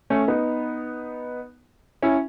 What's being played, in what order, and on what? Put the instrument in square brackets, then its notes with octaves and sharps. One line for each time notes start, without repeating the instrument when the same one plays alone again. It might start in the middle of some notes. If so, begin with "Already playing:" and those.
[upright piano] A3 C#4
B3 D#4
C#4 E4